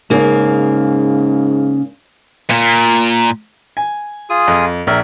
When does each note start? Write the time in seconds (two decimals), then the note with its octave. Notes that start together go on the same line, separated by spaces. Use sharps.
0.10 G#2 C#3 A#3
2.50 A#2
3.77 G#5
4.30 F4 G#4 D#6
4.48 F2
4.87 A#1 A#4 E5